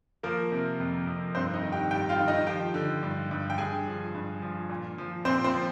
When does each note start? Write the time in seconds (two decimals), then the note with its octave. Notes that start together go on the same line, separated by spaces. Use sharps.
0.23 F3 A#3 A#4
0.52 C3
0.80 F2
1.07 F2
1.35 G2 C4 C5
1.54 D#4 D#5
1.62 D#3
1.72 G4 G5
1.91 G2 G4 G5
2.09 F4 F5
2.19 D#3
2.28 D#4 D#5
2.47 F3 G4 G5
2.74 D3
3.03 G2
3.31 G2
3.50 G5
3.58 G2 G#4 G#5
3.87 F3
4.15 G2
4.42 F3
4.69 A#2
4.98 F3
5.25 A#2 C4 C5
5.44 C4 C5
5.54 F3